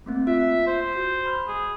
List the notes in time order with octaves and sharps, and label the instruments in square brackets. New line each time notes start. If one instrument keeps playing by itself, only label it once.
[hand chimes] A3 A#3 C4
[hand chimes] F4 [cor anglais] E5
[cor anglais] C5
[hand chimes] F#4 G6
B5 F6 G6
[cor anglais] G#4